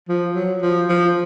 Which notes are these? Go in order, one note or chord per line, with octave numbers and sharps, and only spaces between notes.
F3
F#3
F3
F3